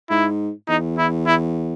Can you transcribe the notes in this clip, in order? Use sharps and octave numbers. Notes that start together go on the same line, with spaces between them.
G#2 E4
E2 D#4
E4
E4